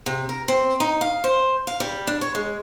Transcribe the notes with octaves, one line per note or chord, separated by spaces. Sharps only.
C3
A#4
C4
D#4
F5
C5
F5
G3
D4
C#5
G#3